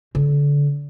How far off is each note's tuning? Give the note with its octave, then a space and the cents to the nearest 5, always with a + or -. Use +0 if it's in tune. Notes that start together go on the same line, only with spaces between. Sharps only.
D3 -30